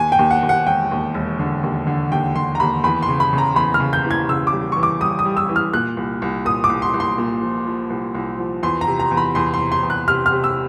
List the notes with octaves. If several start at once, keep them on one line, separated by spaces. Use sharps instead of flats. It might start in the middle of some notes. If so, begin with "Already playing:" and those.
Already playing: D#2 G#5
G5
D#2
F#5
D#2
F#5
E1 G5
D#2
E1
D3
D#2
D3
D#2 G5
D3 C6
A#5
D#2 B5
E2 B5
C6
C#3
B5
C#3
A#5
E2 B5
F6
C#3
G6
E3
G#6
C#3 E6
D6
G3
E3 C#6
D6
G3 D#6
D#6
G3
E6
E3
F6
A#2 F#6
C2
C2
A#2 D#6
D6
C2
C6
C2
C6
A#2
F3
F3
C2
C2
F3
E2 C6
A#5
C3
A#5
E2
B5
E2 C6
C6
C3
C6
E2
F#6
C3 F6
F6
C3
E6